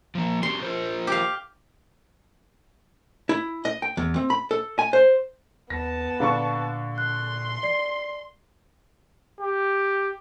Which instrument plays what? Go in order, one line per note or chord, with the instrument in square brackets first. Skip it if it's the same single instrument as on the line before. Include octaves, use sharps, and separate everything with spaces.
[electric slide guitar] F3 A#3
[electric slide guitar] C#4 F#4 G4 [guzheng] C6
[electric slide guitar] F4 A#4 C5
[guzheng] G4 F5
[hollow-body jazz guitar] E4
D#5
G5
E2
C4
B5
A4
G#5
C5
[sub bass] D#2 [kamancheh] B3 A5 [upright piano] A#6
[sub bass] A#2 [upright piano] D3 D4 C#6 [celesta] F5
[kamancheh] C6 [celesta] F#6
[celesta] D5 C7
[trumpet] G4